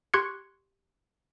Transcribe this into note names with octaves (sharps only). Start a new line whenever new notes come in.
G4 C6 C#6 F#6 G#6 C#7